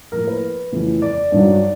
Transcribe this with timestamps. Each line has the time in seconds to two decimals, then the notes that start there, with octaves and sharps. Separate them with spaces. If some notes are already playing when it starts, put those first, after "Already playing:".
0.12 A2 F3 A#3 A#4
0.27 B4
0.72 F2 C#3 E3 A3
1.02 D5
1.32 G2 D#3 F#3